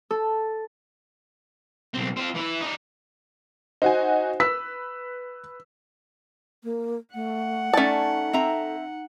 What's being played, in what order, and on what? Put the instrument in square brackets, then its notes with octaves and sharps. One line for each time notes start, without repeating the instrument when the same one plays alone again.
[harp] A4
[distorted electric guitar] B1 C4
C4 F4
E3 E4
D#4 D5
[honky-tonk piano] D#4 F#4 G#5 [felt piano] C5
[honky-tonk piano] B4 [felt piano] E6 B6
[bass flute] A#3
[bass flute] A3 [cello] F#5
[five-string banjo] A3 A5 [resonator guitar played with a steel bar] C#4 D5 [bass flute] D#4
[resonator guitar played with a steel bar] C4 E5 A#5